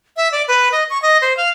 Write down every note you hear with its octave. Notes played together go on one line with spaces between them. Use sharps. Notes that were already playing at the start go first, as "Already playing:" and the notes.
E5
D5
B4
D#5
C#6
D#5
C5
F5